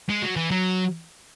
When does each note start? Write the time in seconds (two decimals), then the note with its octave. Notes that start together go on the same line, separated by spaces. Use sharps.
0.09 G#3
0.22 F#3
0.37 E3
0.51 F#3